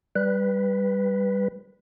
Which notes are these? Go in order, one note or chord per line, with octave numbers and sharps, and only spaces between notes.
G3 B4